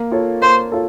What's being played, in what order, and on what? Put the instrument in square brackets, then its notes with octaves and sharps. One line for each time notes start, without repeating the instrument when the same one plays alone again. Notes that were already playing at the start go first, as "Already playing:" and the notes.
Already playing: [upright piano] A#3
F4 A4 C#5
[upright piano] A#3 [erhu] C5
[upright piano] F4 A4 C#5